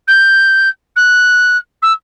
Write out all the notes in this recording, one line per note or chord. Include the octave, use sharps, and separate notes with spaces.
G6
F#6
E6